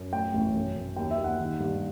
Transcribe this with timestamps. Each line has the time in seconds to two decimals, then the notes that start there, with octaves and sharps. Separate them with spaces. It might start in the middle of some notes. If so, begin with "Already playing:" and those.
Already playing: F#2
0.13 A2 G5
0.33 A1
0.55 F#2
0.76 F#2
0.96 D#2 G5
1.11 E5
1.18 D#2
1.24 F#5
1.39 D#3
1.60 G2